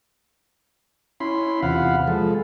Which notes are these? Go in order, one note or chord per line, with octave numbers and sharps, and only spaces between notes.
C#4 E4 B5 C6
E2 C3 F4 F5 F#5 B5
F3 G#3 A4